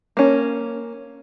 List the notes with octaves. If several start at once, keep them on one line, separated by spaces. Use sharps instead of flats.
A#3 C#4